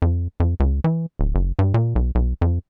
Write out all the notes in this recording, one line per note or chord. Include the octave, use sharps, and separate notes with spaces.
F2
F2
C#2
E3
D1
F#1
G2
A#2
B1
B1
F2